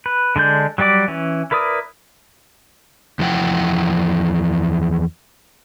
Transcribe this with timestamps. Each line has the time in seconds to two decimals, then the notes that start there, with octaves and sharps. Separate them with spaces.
0.06 B4
0.36 D3 G#3 D4 G6
0.78 F#3 G3 G4 D5 D6
1.08 E3 C#4
1.51 E4 A#4 B4 D5 D#6
3.19 E2 F3 E4 F#5 G5